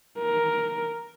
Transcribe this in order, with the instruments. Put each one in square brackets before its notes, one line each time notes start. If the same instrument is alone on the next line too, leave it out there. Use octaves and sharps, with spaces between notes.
[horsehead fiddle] A#4